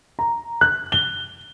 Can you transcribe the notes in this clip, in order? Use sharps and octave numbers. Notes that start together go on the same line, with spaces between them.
A#5
F#6
G7